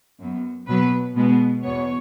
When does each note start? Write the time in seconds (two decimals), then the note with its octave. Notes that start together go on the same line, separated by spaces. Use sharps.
0.19 F#2 F#3 B3
0.67 B2 F#3 B3 B4
1.15 B2 G#3 B3
1.63 E2 B2 B3 C#5